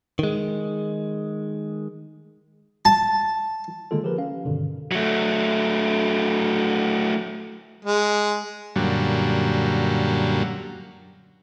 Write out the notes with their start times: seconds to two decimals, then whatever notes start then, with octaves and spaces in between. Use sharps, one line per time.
0.19 D#3 G#3
2.85 A5
3.91 D3 D#3 G#3 A#3 F4 A4
4.04 F3 G4 G#4 A#4 B4
4.18 C#4 F5
4.45 G2 B2 D3 D#3
4.91 F#3 A3
7.85 G#3
8.76 F#2 A#2 D3 F#3 G3